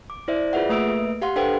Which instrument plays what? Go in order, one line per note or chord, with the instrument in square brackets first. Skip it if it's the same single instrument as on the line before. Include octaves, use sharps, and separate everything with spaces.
[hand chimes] D6
E4 C5 D5 E5
F4 G#4 B4 E5 F#5
A3 A#3 B4 E5 E6 D7
G4 F5 F#5 C6
D4 A4 B4 C5 F#5 G5